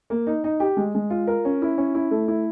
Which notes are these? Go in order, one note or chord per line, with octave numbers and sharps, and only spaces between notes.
A#3
D#4
D#4
G4
G#3
G#3
F4
A#4
C#4
E4
C#4
E4
A3
E4